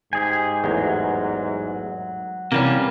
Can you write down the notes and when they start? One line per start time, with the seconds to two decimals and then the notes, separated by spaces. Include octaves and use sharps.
0.13 G#2 G4 G#4 G#5
0.64 A1 E2 F#3
2.52 C3 E3 G3 A#3 C#4